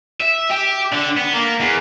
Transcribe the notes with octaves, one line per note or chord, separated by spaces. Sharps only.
E5
G4
D3
B3
A#3
E2